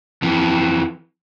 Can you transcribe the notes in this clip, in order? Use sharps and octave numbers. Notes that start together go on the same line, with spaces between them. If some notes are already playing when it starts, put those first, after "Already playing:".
F2 E3